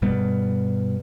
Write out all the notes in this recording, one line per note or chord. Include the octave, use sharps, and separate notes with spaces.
G2 B2 G3 B3